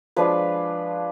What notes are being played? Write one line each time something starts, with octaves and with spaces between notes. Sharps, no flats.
F3 G#3 D4 F4 B4